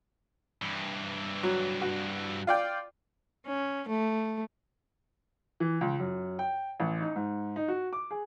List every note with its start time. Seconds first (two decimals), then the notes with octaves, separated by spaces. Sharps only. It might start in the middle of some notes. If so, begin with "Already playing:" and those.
0.62 G2 E3
1.43 F#3
1.81 F#4
2.47 F4 D5 G5
3.46 C#4
3.89 A3
5.60 E3
5.81 C#2
5.99 F#2
6.39 G5
6.80 A1
7.01 D#4
7.16 G#2
7.56 D#4
7.68 F#4
7.93 D6
8.11 G#4